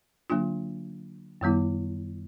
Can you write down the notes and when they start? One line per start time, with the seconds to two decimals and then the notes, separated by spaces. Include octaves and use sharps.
0.30 D3 F#3 A#3 D4 F4
1.41 F#2 D#3 G3 B3 E4